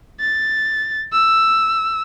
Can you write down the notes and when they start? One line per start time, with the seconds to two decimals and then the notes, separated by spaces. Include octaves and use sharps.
0.20 A6
1.12 E6